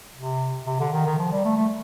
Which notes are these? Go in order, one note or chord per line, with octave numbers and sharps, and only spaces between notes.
C3
C3
D3
D#3
D#3
F3
G3
A3
A3